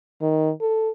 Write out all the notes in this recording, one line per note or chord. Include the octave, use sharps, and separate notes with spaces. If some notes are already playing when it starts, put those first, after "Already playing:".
D#3
A4